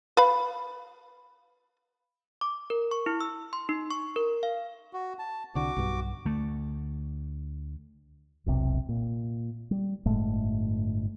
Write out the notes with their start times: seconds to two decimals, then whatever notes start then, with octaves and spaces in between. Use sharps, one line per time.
0.17 B4 F5 B5
2.41 D6
2.70 A#4
2.91 C#6
3.06 E4
3.21 E6
3.53 C6
3.69 D#4
3.91 C#6
4.16 A#4
4.43 F5
4.93 F#4
5.19 A5
5.55 C2 D3 F#4 D6
5.76 B1 G2
6.26 D2 A3
8.46 E1 B1 C3
8.89 A#2
9.71 G3
10.06 G1 A2 G#3 A3